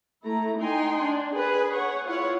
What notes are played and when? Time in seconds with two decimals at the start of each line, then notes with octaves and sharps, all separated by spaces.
0.24 A3 E4 A#5
0.59 D#4 G5 G#5 C6
1.04 D4
1.35 G#4 B4
1.73 C#5 F#5
2.07 E4 F4 C#5 F#5